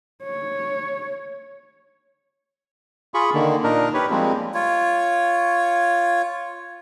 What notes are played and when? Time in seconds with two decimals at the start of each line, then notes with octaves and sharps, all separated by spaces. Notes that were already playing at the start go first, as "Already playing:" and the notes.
0.23 C#5
3.14 F4 G#4 B5 C#6
3.34 D3 D#3 A#3
3.63 A#2 D4 D#4 A#4
3.94 G4 B4 C#5
4.10 F3 G3 G#3 A#3 C4
4.54 F4 C#5